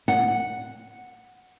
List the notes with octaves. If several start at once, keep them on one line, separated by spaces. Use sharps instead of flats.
F#5